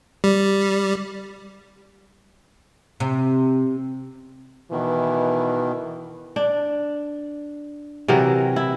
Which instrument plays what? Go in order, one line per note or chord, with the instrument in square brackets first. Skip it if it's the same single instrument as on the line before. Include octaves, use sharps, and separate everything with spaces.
[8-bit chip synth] G3
[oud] C3
[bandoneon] B2 D#3 [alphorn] E3
[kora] D4
C3 E3 F#3 A#4
E4